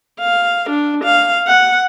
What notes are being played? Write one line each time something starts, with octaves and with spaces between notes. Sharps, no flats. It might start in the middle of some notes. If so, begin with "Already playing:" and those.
F5
D4
F5
F#5